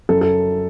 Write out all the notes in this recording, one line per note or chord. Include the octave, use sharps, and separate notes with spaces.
F#2 A4
A4